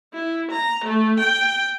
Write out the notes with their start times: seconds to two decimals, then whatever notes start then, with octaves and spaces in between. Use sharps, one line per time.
0.13 E4
0.51 A#5
0.85 A3
1.20 G5